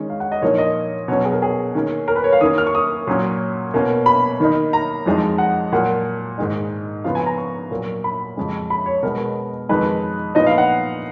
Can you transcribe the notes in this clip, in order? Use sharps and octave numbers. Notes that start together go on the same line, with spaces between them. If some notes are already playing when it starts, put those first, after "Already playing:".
Already playing: D#3 G#3 C#4
F5
F#5
D#5
A#2 F3 A#3 D#4 C#5
D#5
B2 F#3 C#4 C#5
G#4
A#4
G#4
D#3 A#3 C#4
A#4
B4
C#5
F5
D#3 A#3 C#4 D#6
F6
C#6
D#6
A#2 F#3 C#4
B2 A#3 C#4
B5
D#3 A#3 D#4
A#5
F2 F3 G#3 D#4
F#5
A#2 F#3 A#3 F#5
G#2 D#3 G#3 D#4
C#3 F3 B3 F5
G#5
A#5
C#6
A#2 F#3 A#3
B5
F2 C#3 G#3
B5
C#5
B2 G#3 B3 A#4
F2 D#3 G#3 D#4 B4
A#2 F3 B3 D#4 D#5
F5
F#5